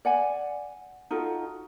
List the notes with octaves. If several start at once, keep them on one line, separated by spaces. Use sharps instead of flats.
D5 F#5 G#5
D#4 F4 F#4 A4